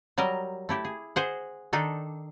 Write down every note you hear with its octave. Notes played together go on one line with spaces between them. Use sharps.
F#3 G3 A#4 D#5
A3 E4 G4
G#4
G#4 C5 D#5 F#5
D#3 D4 D#4 A4